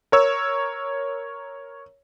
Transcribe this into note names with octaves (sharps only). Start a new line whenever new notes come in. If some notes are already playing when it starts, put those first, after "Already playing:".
A#4 C#5 E6